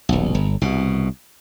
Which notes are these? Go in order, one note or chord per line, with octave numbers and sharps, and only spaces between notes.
D#1 B1
G1
C2 B2